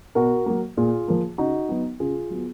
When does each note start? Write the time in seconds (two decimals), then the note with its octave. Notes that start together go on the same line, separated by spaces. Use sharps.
0.15 B2 F#4 A#4
0.46 F#3 A#3
0.77 A#2 F4 G#4
1.08 F3 A#3
1.38 C#3 D#4 F#4
1.69 F#3 B3
2.00 C#3 F4 G#4
2.30 F#3 B3